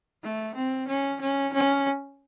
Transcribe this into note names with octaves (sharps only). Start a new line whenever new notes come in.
A3
C4
C#4
C#4
C#4